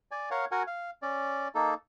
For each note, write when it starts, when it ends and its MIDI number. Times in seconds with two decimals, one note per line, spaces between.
0.11 0.29 74
0.11 0.29 80
0.31 0.45 70
0.31 0.45 73
0.31 0.45 77
0.31 0.45 78
0.51 0.63 66
0.51 0.63 70
0.51 0.63 78
0.51 0.63 80
0.67 0.90 77
1.02 1.48 61
1.02 1.48 74
1.55 1.74 58
1.55 1.74 63
1.55 1.74 69